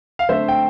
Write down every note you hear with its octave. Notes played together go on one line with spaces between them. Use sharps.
F5
D3 A3 C4 C5 E5
G5